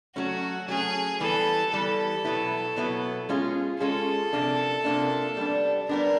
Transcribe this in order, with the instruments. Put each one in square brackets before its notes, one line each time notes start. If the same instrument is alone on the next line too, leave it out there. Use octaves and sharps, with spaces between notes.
[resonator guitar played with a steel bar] F#3 A3 C#4 [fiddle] F#4
[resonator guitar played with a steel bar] F#3 A3 C#4 [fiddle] G#4
[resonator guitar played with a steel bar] E3 G3 B3 [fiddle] A4
[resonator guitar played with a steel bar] E3 G3 B3 [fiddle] A4
[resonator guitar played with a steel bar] B2 F#3 B3 E4
B2 F#3 B3 E4
G#3 C#4 F4 G#4
[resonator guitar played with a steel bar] G#3 C#4 F4 G#4 [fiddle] A4
[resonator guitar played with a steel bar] C3 F3 A#3 D4
C3 F3 A#3 D4
G3 B3 D4
[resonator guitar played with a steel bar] G3 B3 D4 [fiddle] A#4